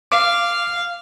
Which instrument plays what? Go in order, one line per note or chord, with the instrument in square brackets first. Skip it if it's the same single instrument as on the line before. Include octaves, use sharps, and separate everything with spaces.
[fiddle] F5 [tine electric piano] D6